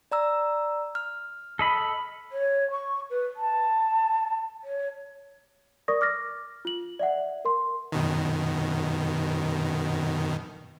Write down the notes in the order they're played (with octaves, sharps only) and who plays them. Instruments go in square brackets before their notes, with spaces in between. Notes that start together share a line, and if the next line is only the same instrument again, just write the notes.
[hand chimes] D5 A#5 E6
F6
[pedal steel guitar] A4 D#5 B5
[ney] C#5
C#6
B4
A5
C#5
[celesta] A#4 D5 C#6 D#6 A#6
D6 F6 A6 A#6
F4 F#7
D5 E5 F#5
A#4 C6
[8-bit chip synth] F#2 B2 D#3